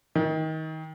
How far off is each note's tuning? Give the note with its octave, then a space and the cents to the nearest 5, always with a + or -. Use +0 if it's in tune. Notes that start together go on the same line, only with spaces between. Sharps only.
D#3 +25